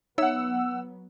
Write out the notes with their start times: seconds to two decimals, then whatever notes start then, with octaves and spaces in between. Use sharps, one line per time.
0.18 F#3 B3 D#4 C#5 E5 F#5 E6